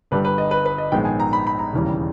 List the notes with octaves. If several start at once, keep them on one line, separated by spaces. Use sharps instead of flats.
G1 G2 G3 B4
B4
D#5
B4
B4
D#5
A#1 G#2 D#3 G#3 B3 G5
G#5
A#5
B5
B5
A#5
E1 D#2 C#3 E3 G3